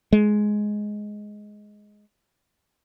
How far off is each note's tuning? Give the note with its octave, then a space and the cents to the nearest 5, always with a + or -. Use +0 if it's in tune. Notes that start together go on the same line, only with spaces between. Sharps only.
G#3 +10